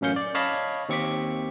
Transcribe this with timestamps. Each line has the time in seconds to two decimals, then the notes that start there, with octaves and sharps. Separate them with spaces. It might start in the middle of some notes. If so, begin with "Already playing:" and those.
0.01 A1 F#2 C#4 F5 G6 C#7
0.16 D5
0.35 C#5 D#5 F5 A5 B5
0.89 D#2 C4 C#6 D6 B6